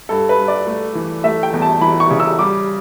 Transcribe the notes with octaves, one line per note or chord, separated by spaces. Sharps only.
G2 A4
B4
G2
D5
A3
E3
A3 E5
G5
E2
A5
E3 B5
C#6
C#3
E6
G3 D6